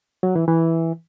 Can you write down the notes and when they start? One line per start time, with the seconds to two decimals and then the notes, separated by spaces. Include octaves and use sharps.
0.23 F#3
0.36 E3
0.48 E3